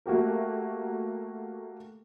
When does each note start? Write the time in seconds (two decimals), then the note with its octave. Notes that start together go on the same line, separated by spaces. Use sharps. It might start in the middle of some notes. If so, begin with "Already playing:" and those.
0.06 A3 A#3 F#4 G4 A#4